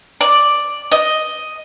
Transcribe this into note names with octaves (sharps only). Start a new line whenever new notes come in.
D5
D#5